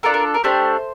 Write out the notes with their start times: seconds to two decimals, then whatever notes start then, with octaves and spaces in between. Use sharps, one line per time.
0.03 D4 F4 A4 A#4
0.14 A#4
0.34 A#4
0.44 A3 D4 G4 C5